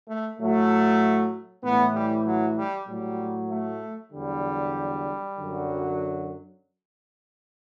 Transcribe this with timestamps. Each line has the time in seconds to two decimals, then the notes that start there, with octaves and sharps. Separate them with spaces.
0.08 A3
0.39 A2 F#3 A3
1.64 A2 E3 B3
1.95 G3
2.26 F#3
2.58 G3
2.87 A2 F#3 G3
3.50 A3
4.13 E2 D3 F#3 G3
5.37 F#2 D3 F#3